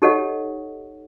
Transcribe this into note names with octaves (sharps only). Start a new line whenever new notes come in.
D#4 G4 A4 C#5 D#5 F#5